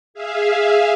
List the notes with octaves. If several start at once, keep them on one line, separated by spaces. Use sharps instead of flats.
G#4 E5 F5